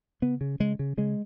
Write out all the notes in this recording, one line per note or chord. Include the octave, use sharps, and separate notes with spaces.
C#3 B3
C#3
C#3 G#3
C#3
C#3 G#3